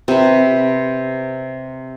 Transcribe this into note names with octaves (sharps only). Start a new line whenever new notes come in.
C3 B4